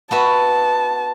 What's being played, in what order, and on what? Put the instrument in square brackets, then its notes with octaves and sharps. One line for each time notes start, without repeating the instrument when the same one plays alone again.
[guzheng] B3 F#4 E5 [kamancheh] A5